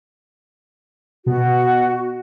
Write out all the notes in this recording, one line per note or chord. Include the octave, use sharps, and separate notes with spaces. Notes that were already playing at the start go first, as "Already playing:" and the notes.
B2 F#4